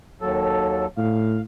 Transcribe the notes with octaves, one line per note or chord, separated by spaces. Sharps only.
D#2 F#3 A4
A2 F5